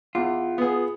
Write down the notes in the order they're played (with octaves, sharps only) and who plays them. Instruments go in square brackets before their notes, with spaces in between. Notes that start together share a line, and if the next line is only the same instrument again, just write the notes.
[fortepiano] E2 [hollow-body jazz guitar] F4
[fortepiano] B3 G#4